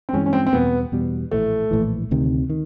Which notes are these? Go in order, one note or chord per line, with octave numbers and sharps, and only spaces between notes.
C4
G2 E3 G#3 C#4
C#4
C4
C4
E2 B2 G3 B3
E2 B2 G3
A#1 A2 E3 A3
A#1 A2 E3
D2 C3 D#3
D#3